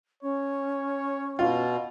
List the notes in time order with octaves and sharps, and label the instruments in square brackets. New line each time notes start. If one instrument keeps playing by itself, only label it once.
[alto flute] C#4 [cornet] C#5
[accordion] B2 [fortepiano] F4